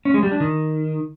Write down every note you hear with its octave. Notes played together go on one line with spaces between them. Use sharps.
C#4
G#3
G3
D4
D#3